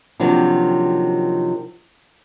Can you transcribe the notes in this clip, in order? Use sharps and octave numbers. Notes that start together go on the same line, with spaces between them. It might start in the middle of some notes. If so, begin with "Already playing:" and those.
C3 D#3 F3 F#3 A#3 D4